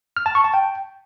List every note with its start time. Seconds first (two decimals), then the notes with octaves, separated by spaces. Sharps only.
0.17 F6
0.26 A5
0.35 C#6
0.44 A5
0.54 G5